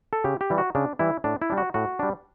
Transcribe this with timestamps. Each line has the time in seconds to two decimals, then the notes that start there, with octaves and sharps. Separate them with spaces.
0.13 A4
0.24 C#3 G4
0.41 G4
0.50 E3 G3
0.58 F#4
0.75 C#3 D4
0.99 E3 G3 E4
1.24 A2 D4
1.42 E4
1.50 G3 D4
1.58 F#4
1.74 A2 F#4
1.99 G3 D4